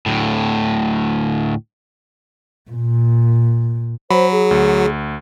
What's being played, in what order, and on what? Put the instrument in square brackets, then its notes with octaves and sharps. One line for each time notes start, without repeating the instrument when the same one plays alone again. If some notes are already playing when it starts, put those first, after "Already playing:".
[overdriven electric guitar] D2 A2
[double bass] A#2
[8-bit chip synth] F#3 [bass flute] C5 [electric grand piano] B5
[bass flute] G#4
[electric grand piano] D2